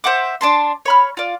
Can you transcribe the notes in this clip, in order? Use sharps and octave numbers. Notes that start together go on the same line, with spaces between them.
C5 E5 F#5 D6
D4 A5 C6
C#5 B5 F6
F4 D5